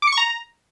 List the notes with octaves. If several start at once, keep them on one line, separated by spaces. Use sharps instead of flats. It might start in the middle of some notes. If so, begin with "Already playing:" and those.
D6
C#7
C#6
A#5